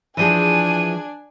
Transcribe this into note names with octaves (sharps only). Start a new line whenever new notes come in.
E3 F3 D4 G#4 G#5 D#7